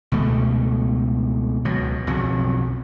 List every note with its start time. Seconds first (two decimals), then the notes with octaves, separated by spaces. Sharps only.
0.12 C#2 B2 A3
1.65 C#2 B2 F#3
2.07 B1 F2 C#3 F#3